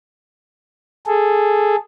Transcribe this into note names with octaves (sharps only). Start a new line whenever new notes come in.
G#4 A4